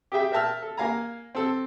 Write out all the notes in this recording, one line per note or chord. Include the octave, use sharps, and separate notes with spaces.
G4 G#4 E5 G5
A#4 E5 G5 A5 E6 F6
A4
A#3 F5 G#5 A#5
C4 A4